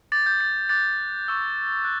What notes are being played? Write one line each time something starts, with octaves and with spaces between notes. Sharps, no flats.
D6 G6 A6
G6
A6
D6 F#6 A6
C#6 E6 G6
F#6